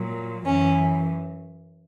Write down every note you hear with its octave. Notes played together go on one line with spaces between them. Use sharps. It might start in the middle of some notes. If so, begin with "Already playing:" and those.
Already playing: A#2 F#3
F#2 E3 C#4